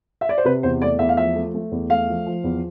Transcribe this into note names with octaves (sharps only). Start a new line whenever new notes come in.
E5
D5
C5
C3 B4
E2 C5
A3 D5
E2 E5
F5
F3 E5
A3
A3
E2
A3 F5
F3
F3
E2